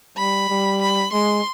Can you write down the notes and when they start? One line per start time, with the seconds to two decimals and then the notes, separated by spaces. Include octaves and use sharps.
0.17 G3 B5
0.50 G3
0.82 B5
1.12 G#3 C6